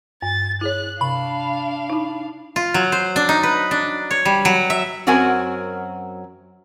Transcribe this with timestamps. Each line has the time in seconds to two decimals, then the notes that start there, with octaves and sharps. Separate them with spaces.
0.22 G2 A6
0.61 E4 G#4 C#5 F#6
1.01 C3 D4 F5 B5
1.90 D#4 E4
2.56 F4
2.74 F#3
2.92 C5
3.16 D4
3.29 D#4
3.43 B4
3.71 D4
4.11 C#5
4.25 G3
4.45 F#3
4.70 E5
5.07 F#2 F#3 C4 F#4 A#4 G#5